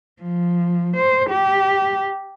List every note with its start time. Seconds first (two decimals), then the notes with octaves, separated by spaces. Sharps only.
0.22 F3
0.97 C5
1.30 G4